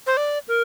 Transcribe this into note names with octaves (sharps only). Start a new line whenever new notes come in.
C5
D5
A#4